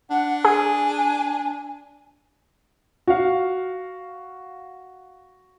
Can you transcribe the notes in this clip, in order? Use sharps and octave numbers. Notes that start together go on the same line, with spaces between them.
D4 F#5
G#4 G#5
F#4 F5